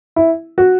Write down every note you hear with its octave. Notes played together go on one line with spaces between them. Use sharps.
E4
F#4